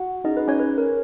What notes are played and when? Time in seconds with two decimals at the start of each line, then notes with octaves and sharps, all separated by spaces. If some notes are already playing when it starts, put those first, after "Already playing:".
Already playing: F#4 F#5
0.24 C#4 D#4 G#4 D#5
0.37 B4
0.48 C#4 C#5
0.60 B4
0.78 A#4